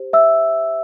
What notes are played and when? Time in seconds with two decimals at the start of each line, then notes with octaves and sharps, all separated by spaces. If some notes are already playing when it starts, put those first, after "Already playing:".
Already playing: G4 C5
0.13 E5 E6